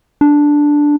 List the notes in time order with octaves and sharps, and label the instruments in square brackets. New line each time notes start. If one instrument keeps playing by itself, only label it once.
[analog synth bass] D4